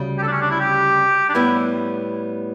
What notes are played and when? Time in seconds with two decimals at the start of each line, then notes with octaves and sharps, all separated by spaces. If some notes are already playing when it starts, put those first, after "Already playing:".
Already playing: D2 C#3 G3
0.18 G4
0.22 A4
0.27 D4
0.32 C#4
0.41 D4
0.51 E4
0.60 G4
1.29 D4
1.34 A2 G3 B3 E4